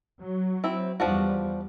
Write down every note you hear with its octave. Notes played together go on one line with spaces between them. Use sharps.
F#3
C4 E4
E2 F3 G3 D4 F#4